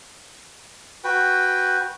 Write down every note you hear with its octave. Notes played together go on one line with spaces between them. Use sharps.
F#4 B4 G5